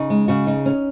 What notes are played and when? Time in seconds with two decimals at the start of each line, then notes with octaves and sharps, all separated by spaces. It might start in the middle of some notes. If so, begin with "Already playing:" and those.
Already playing: C#3 D#4
0.10 G#3
0.28 C#3 F#4
0.47 D#4
0.66 C#4